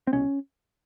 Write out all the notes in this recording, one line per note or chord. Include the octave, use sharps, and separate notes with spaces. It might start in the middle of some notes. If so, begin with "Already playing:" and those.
C4
C2 B2 C#4